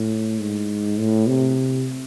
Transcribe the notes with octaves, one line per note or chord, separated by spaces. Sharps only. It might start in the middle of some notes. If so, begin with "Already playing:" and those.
Already playing: A2
G#2
A2
C3